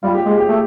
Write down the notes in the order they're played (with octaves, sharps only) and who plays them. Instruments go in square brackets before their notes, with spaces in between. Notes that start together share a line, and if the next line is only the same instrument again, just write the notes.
[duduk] G3 [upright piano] F4
[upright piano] G4
[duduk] G#3 [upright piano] G#4
[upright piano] G4
[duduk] A3